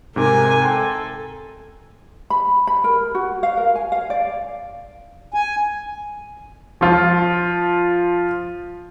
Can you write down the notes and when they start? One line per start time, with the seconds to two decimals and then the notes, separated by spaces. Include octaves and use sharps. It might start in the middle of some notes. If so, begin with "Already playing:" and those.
0.16 G#2 C3 A#4 G#5 D6
0.62 A4 G5 A#5 C6
2.30 B5
2.67 B5
2.84 A#4
3.15 F#4
3.43 F5
3.57 A#4
3.76 G#5
3.92 F5
4.10 D5
5.34 G#5
6.81 F3 F4